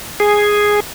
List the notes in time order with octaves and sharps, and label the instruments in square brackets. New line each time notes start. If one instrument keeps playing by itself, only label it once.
[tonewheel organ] G#4